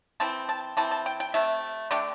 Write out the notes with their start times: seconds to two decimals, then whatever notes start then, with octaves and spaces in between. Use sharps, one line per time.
0.20 E3 C4 A5
0.49 A5
0.77 E3 C4 A5
0.91 A5
1.06 G5
1.20 G5
1.34 C3 A3 E5
1.91 D3 A3 D4 G4